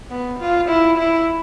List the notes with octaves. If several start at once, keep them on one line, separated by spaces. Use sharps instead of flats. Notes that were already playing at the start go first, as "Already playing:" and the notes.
B3
F4
E4
E4